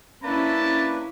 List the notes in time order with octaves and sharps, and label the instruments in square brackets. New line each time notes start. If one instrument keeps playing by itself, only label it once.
[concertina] A#3 D4 B4 [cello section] C#4 E4 [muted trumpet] A5 [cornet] B5